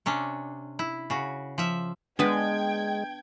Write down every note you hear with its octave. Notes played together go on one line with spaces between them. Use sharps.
C3 C#4 D4
E4
C#3 F#4
F3 E5
G#3 B3 D4 B4 G5 G#6